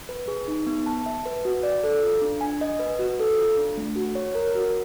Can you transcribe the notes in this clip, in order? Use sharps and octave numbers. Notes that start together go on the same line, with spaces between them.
B4
G#4
D#4
B3
A5
E5
B4
F#4
D5
A4
F4
D4
G#5
D#5
B4
F#4
A4
F4
D4
A3
F#4
C#5
A#4
F#4